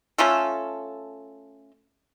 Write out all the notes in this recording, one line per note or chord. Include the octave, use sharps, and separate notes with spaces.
A3 C#4 F4 A4